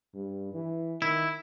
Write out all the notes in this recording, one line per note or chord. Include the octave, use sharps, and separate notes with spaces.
G2
E3
D#3 E4